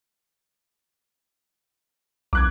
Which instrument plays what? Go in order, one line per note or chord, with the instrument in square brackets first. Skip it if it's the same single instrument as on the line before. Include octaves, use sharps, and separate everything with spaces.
[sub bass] B1 [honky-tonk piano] D6 F#6 G#6